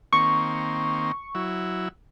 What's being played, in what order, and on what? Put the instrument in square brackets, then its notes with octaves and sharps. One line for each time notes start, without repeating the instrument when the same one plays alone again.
[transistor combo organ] D#3 A#3 C4 [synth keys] C#6
[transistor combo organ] F#3 E4